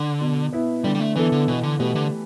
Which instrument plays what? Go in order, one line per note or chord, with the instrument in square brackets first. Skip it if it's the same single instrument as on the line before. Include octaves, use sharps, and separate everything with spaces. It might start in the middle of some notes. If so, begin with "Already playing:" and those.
Already playing: [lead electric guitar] D3
[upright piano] B2
B3 E4
[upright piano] D3 [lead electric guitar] G3
[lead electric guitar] G3
A3
[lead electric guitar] E3 [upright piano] B3 E4 A4
[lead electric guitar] D3
[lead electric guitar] B2 [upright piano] E3
[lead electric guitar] D3
[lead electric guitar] B2 [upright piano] A3 G4 B4
[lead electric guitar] D3